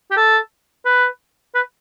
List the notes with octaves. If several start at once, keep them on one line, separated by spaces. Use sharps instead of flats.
G4
A4
B4
B4